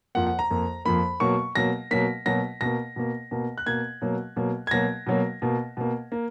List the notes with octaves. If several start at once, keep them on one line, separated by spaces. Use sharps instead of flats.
F2 F3 A#3 F#5
F#5
A#5
F2 F3 A#3
F2 F3 A#3 B5
B2 F#3 A#3 C#6
B2 F#3 A#3 A#6
B2 F#3 A#3 B6
B2 F#3 A#3 A#6
B2 A#3 A#6
B2 A#3
B2 A#3
F#6
B2 A#3 G#6
B2 F#3 A#3
B2 F#3 A#3
G#6
B2 F#3 A#3 A#6
B2 F#3 A#3
B2 A#3
B2 A#3
A#3